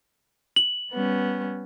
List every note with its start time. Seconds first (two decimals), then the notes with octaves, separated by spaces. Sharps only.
0.56 F#7
0.91 G3 B3 C#4